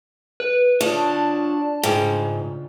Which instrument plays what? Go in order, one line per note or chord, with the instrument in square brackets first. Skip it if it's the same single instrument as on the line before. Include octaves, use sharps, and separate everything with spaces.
[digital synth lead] B4
[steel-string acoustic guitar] D4 [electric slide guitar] F4 C#5 [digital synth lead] A5
[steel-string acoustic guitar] G#2 [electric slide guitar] C#3 F4 G5